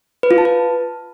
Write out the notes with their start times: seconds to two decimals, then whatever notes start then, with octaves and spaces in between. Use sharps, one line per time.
0.23 B4
0.31 F4
0.38 A5
0.45 B4